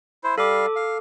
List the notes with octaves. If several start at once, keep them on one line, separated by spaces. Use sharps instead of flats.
E4 C5
G3 A4 F5 D6
F5